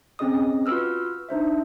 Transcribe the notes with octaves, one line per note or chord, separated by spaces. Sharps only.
C4 C#4 G#4 D#5 D#6
F4 F#4 B4 E6 F6
D4 D#4 C5 E5